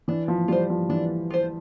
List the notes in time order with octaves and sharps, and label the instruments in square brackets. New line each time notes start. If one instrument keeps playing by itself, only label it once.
[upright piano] E3 [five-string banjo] D4
[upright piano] F3
[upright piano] G3 [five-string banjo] F4 C5
[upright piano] F3
[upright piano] E3 [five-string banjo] D4
[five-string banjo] F4 C5